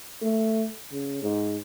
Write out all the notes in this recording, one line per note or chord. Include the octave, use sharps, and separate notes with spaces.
A3
C#3
G#2